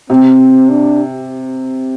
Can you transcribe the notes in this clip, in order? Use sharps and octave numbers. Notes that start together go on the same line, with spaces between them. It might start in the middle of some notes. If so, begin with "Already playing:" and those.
C3 C4
D4